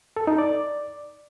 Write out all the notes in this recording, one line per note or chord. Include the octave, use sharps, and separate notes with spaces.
A4
D#4
D5